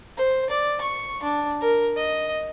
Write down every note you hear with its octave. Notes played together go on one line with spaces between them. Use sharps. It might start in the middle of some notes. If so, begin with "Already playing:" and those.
C5
D5
C#6
D4
A#4
D#5